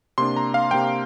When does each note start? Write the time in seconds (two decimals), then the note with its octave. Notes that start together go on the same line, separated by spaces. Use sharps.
0.18 C3 A#3 D4 C6
0.37 A#5
0.54 F5
0.71 C3 A#3 D4 G5